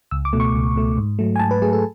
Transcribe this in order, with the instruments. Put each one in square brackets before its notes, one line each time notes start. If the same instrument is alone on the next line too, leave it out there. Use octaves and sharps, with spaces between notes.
[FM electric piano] C#2 E6
D6
B2 A3
C#6
C#2
B2 A3
G#2
F#3 A3
G#5
G#2 A5
B4
F#3 A3 G#4
A4